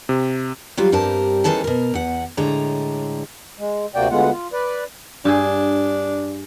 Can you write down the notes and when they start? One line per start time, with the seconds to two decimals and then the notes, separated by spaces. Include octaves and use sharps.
0.09 C3
0.77 F#3 G3 F4 F#4
0.92 G2 G3 C4 A#4 A5
1.44 D#3 E3 G#3 C#4 A4 A5
1.64 B2 A#4
1.94 E2 F#5
2.37 A2 D3 G#3 C#5 A#5
3.59 G#3
3.95 D2 C3 A#3 F#4 D5 G5
4.11 D2 D3 G#3 B3 F4 F#5
4.32 F4
4.53 B4 D5
5.25 G2 D4 G#4